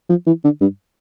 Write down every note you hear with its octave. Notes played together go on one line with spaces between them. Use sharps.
F3
E3
D3
G2